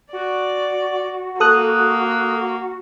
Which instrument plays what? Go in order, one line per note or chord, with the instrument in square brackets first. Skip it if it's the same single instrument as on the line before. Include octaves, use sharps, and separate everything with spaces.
[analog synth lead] F#4 [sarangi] D5
[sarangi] A#3 [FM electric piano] A4 D#6 F#6